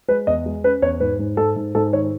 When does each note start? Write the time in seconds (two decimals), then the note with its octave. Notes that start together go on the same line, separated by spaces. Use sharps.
0.08 G#3 B4
0.27 E2 D#5
0.46 G#3
0.64 C#4 B4
0.82 E2 C#5
1.00 G#2 B4
1.19 G#2
1.37 G#2 A4
1.56 G#2
1.75 G#2 A4
1.93 D#3 C#5